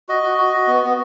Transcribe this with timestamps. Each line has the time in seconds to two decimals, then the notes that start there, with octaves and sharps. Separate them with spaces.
0.09 F#4 D#5
0.23 F#4
0.38 F#4
0.53 F#4
0.68 B3
0.83 B3